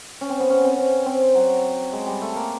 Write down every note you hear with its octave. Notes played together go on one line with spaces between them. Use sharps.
C#4
C4
B3
C#4
C4
C#4
C4
F#3
G#3
G3
A3
A#3